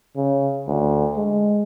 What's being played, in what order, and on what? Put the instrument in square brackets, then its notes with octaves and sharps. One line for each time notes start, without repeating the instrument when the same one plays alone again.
[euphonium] C#3
D2
G#3